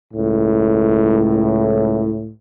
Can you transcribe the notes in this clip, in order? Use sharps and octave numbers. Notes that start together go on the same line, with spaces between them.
C#2 A2